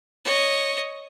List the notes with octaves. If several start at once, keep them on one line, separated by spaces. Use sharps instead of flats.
C#5 D#5